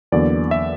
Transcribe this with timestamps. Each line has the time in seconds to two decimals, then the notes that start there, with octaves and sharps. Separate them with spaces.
0.12 E2 D3 F#3 A#3 D5
0.51 E5